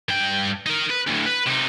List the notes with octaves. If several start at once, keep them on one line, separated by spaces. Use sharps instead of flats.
G2 G5
D#4 A#4
B4
D2 A2
B4
C3 D#4